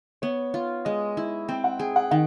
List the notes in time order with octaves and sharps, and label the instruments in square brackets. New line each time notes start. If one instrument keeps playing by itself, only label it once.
[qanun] B3 [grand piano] C#5
[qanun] F4
[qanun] G#3 [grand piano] D#5
[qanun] E4
[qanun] C4 [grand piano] G5
[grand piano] F#5
[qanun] G#4 [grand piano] G5
[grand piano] F#5
[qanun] D#3 [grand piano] F#5